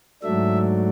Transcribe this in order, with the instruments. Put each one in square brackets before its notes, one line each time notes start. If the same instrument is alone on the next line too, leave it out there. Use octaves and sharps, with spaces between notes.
[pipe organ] G#2 F#3 A3 D4 E5